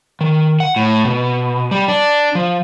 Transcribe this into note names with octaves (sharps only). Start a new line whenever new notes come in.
D#3
F#5
A2
B2
G3
D4
F3